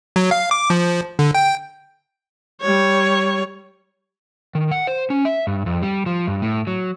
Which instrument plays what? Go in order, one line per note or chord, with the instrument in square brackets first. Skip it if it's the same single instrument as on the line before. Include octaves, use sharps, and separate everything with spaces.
[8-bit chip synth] F#3
F5
D6
F3
D3
G5
[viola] G3 C#5
[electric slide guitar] D#3
F#5
C5
C#4
E5
G2
F2
G3
F3
G2
A2
F#3